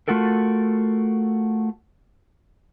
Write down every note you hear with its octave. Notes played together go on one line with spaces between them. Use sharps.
A3 F4 F#4 A4 A#4